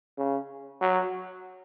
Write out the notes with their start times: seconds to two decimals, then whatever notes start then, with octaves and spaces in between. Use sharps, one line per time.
0.18 C#3
0.81 F#3